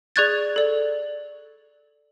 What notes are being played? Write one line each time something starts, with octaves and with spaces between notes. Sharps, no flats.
G#4 D5 C#6 F#6 G#6 A6
A4 D5